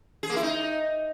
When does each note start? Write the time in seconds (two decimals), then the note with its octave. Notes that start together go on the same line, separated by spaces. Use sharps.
0.23 G#4
0.30 A#3
0.36 E4
0.43 D#4